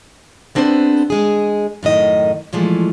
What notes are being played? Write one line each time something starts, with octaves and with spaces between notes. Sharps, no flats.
B3 C4 D4 G#4 C5
G#3 G#4
F#2 A2 D#3 D#5
A#2 E3 F3 G#3 A3